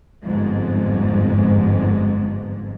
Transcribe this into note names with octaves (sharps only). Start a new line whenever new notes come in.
G1 F2 G#2